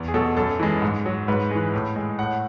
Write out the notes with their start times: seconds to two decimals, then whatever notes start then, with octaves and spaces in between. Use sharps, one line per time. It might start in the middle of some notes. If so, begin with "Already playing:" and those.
Already playing: E2
0.08 G#4
0.14 B2 F#3 A4
0.37 F#2 A4
0.60 E3 G#3
0.82 G#2
1.06 F#3
1.28 G#2 B4
1.51 E3 G#3
1.74 A2
1.96 G#3
2.19 A2 F#5